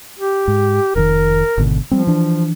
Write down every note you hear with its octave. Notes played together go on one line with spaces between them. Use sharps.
G4
G#2
F1 C3 D#3 A#4
G#1 B2 D3
F3 G3 C4
E3 D4